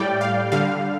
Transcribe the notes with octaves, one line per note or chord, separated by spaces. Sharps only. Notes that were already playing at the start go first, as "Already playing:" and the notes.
Already playing: A2 G3 D5 G5
F5
D3 G3 F5